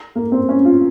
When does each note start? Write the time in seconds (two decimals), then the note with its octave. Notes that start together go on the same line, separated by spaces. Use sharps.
0.15 A#3
0.32 C4
0.49 C#4
0.65 F4